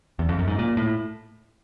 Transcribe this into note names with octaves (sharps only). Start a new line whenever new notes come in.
E2
F2
F#2
G#2
A#2
A2